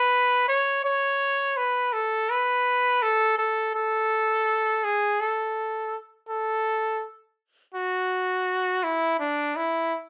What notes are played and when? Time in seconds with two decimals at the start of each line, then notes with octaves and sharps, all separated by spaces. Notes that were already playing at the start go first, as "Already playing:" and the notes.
Already playing: B4
0.48 C#5
0.85 C#5
1.57 B4
1.93 A4
2.30 B4
3.03 A4
3.39 A4
3.75 A4
4.84 G#4
5.20 A4
6.29 A4
7.74 F#4
8.84 E4
9.20 D4
9.56 E4